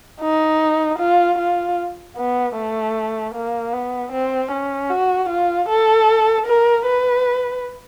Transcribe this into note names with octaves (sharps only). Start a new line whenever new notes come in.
D#4
F4
F4
B3
A3
A#3
B3
C4
C#4
F#4
F4
A4
A#4
B4